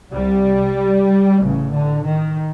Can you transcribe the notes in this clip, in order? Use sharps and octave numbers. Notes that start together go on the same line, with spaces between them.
C2 C3 G3
A1 A2 C#3
D3
D#3